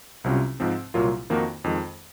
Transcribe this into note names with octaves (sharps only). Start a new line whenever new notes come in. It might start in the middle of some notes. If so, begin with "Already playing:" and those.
C2 C3 F#3 C#4 F4
G#2 F3 C4
C2 A#2 F#3 A#3 F4
F2 D#3 A#3 D#4 F#4
F2 D#3 G#3